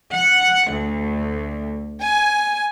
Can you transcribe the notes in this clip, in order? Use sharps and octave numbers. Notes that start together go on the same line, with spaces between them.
F#5
D2
G#5